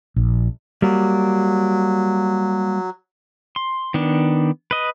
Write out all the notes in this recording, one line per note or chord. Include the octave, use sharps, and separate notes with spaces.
A#1
F#3 G3 A#3
C6
D#3 B3 D4
B4 D#5